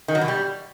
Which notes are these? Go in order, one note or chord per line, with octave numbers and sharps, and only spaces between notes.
D#3
F#3
B2
G3